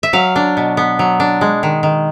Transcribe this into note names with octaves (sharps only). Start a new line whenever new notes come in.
E5
F#3 F5
D4
B2
B3
F#3
D4
G#3
D#3
D#3